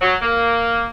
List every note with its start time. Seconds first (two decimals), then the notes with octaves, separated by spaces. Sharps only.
0.01 F#3
0.21 A#3